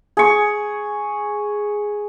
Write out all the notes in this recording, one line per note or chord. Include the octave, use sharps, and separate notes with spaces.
G#4 C#6